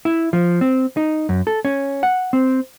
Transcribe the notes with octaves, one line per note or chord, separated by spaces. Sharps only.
E4
F3
C4
D#4
F#2
A4
C#4
F#5
C4